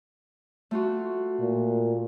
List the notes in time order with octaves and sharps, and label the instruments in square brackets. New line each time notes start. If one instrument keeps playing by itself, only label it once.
[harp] A3 F4 F#4
[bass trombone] A#2